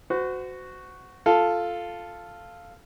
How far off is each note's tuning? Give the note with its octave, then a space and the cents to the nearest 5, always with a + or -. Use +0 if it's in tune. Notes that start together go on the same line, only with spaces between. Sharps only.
F#4 +0 C5 -40
F4 +0 A4 +0